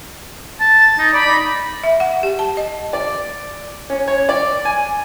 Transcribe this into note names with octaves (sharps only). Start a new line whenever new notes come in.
A5
A6
D#4
D5 B5
D#4
E5
F#5
G4
A5
D#5
D5
C#4
C#5
D5
G#5